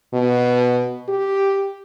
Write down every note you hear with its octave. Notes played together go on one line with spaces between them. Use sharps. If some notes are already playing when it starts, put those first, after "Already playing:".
B2
G4